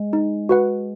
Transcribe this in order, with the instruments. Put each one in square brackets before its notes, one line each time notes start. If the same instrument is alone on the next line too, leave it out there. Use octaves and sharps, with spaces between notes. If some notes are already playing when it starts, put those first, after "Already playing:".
Already playing: [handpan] G#3
[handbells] D#4
F#4 B4 F#5